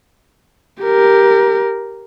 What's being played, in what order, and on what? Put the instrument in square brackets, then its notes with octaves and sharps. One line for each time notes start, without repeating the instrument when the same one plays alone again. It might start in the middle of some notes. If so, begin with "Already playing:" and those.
[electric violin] G4 A#4